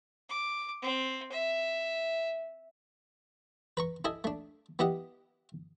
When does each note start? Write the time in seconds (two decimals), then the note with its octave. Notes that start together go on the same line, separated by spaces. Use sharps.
0.29 D6
0.83 C4
1.32 E5
3.77 B4 A#5 C#6
4.05 E4 A4 D#5 G#5
4.24 A3 D4
4.79 B3 E4 G4 D#5 F#5